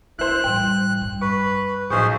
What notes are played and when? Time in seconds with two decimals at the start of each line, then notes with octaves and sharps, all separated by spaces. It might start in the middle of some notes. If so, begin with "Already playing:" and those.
0.19 D4 E4 C5 F#6
0.44 A1 G3 G5
1.01 G2
1.21 B4 C#6
1.90 B1 A2 F3 G#4 C5 C#6